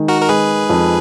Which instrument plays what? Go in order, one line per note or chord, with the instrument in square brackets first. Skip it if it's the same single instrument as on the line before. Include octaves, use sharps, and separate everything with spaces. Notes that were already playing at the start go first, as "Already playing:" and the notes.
Already playing: [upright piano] D#3 G#3
[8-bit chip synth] F#4 A#4
A#4
[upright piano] G#3 [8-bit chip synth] G#4 B4
[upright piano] F2